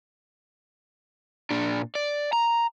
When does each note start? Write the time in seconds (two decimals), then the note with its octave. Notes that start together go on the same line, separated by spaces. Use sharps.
1.50 A#2 D4
1.95 D5
2.33 A#5